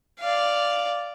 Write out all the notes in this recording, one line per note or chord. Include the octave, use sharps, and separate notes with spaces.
D5 F5